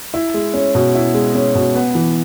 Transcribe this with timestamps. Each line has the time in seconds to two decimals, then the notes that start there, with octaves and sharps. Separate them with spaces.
0.14 E4
0.34 G#3
0.54 C#4
0.75 B2
0.95 E4
1.14 G#3
1.35 C#4
1.55 B2
1.75 B3
1.95 E3